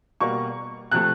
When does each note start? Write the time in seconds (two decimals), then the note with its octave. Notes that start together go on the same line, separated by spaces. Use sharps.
0.20 B2 G3 A#3 C#6
0.91 C3 F3 A3 F#6